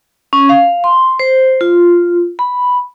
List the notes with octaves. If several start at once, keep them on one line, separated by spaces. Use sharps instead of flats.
C#4
F5
C6
C5
F4
B5